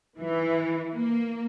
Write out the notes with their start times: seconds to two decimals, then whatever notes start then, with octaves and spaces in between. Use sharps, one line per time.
0.19 E3
0.95 A#3